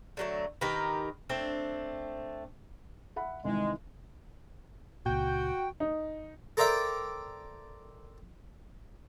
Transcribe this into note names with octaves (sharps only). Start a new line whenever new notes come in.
D3 F#3 A3
D#3 G4 A#4 B4
A3 C4 D4
E5 F#5 B5
C2 D#3 E3 G#3
C#2 A#2 F#4 G5
D#4
A4 A#4 C5 D5 E5 G5